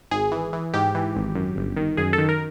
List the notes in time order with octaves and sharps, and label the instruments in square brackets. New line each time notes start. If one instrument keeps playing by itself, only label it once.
[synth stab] G#1 G#4
E3
E3
G#2 G4
E3
G#1
F#2
G1
D#3
F#2 G#4
A4
D#3
A#4